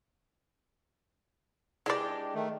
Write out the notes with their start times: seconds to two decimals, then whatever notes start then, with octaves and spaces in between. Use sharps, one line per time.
1.86 G#3 D4 E4 G4 D5
2.35 D#3 A3